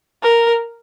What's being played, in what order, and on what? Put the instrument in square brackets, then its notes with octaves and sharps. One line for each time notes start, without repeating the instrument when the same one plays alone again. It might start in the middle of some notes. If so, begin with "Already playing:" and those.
[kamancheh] A#4